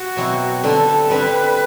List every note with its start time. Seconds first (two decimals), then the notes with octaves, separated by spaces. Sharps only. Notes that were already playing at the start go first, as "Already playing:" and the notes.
Already playing: F#4
0.17 B2 F#3 C4 E4
0.63 D3 G3 C4 A4
1.10 D3 G3 C4 B4